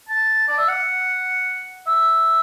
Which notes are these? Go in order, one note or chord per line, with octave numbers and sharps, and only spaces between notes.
A5
D5
E5
F#5
E5